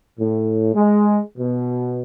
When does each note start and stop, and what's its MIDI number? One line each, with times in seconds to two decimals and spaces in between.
0.20 0.70 45
0.74 1.18 56
1.38 2.02 47